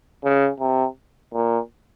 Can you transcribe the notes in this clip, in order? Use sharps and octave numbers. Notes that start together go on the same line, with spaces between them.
C#3
C3
A#2